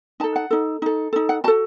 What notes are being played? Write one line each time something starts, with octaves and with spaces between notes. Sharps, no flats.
D#4 A4 A5
F#5
D#4 A4
D#4 A4
D#4 A4
F#5
F#4 A4 A5